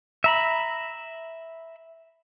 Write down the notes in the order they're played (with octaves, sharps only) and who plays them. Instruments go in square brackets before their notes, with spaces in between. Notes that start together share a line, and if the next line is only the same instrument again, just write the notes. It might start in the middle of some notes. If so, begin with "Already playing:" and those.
[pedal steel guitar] E5 A#5 B5